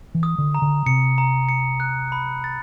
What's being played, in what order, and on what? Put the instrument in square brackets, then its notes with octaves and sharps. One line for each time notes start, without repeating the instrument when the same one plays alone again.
[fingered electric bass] E3
[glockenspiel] D#6
[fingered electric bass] D3
[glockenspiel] A#5
[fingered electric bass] D3
[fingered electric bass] C3 [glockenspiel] C#7
[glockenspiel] A#5
C#7
F#6
B5
A6